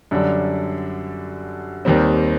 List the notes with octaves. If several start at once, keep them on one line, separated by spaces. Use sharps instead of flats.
F#2 D3 G3 D4
D#2 D#3 G3 C4